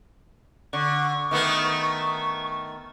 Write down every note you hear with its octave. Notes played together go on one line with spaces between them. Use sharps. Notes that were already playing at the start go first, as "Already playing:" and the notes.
D3 C#6
D#3 A3 B3